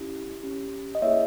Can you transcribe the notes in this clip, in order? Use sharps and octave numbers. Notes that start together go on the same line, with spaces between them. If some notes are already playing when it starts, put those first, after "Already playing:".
Already playing: C#4 E4 G4
C#4 G4
D#5
A#3 E4 G#4 C#5 E5